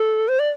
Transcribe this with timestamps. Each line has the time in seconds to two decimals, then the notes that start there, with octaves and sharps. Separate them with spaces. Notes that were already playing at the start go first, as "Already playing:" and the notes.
Already playing: A4
0.28 C5
0.39 D5